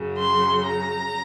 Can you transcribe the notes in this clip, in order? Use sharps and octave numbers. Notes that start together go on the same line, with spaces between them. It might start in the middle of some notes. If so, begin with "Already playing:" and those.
Already playing: F#2 C#3 F#3
C6
A#5